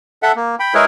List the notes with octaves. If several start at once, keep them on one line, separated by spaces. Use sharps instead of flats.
A4 E5 F#5
A#3
G5 B5
G#3 E4 G#4 A#4 B4 C#5